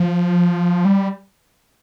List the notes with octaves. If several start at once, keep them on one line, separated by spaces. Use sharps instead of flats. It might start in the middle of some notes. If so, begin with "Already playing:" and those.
Already playing: F3
G3